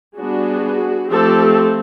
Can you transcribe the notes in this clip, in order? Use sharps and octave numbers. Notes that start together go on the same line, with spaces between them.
G3 B3 D4 F#4 G#4
F3 A3 C4 G4 A4